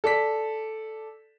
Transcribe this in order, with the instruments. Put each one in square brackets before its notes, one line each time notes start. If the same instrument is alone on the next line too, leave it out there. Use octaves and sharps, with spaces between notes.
[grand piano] A4 D5 B6